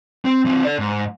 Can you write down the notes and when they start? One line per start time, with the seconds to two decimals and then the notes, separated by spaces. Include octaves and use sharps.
0.25 C4
0.45 E3 C4
0.64 A4 D5
0.79 G#2